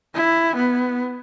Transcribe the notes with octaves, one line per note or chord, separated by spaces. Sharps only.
E4
B3